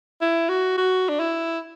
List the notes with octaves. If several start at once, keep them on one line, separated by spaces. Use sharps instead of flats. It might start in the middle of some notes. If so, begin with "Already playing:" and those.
E4
F#4
F#4
D4
E4